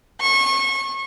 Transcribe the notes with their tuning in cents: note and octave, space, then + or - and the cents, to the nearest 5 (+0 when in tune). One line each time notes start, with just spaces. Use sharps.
C#6 -30